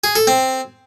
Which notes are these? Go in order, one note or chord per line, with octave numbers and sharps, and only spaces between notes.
G#4
A4
C4